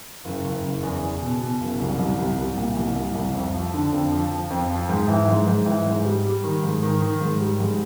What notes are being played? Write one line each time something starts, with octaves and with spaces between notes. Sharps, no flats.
F#1
F#1
F#1
E2
E2
B2
B2
F#1
C2
C2
C2
C2
A#2
C2
C2
C2
F2
F3
D3
F2
F3
F3
F2
F3
G#2
E3
G#2
G#2
E3
G#2
G3
G3
D#3
G#2
D#3
D#3
G#2
G3
G#2